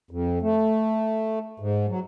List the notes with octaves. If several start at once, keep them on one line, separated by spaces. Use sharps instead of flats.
F2
A3
G#2
F#3